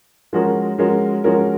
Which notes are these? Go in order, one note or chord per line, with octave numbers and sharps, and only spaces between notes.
F3 G#3 C#4 F#4 A#4
F3 G#3 C#4 F#4 A#4
F3 G#3 C#4 F#4 A#4